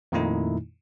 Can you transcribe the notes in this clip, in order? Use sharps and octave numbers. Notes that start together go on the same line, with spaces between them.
F2 A#2 D#3 A3 D#4 E4